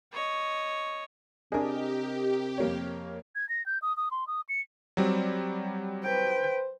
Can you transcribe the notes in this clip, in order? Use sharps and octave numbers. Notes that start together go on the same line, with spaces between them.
C#5 D#5
C3 D4 G4 G#4 A#4 D#5
F2 A#3 C#5
G#6
A#6
G6
D#6
D#6
C6
D#6
C#7
F#3 G3 C4
B4 C5 G5